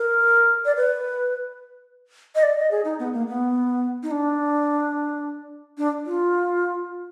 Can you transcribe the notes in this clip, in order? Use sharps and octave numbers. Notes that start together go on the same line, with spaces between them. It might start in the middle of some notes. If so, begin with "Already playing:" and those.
Already playing: A#4
D5
B4
D#5
D5
D#5
G#4
D#4
B3
A#3
B3
D#4
D4
D4
F4